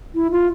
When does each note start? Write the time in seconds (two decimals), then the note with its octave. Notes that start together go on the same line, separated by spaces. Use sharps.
0.15 E4
0.31 F4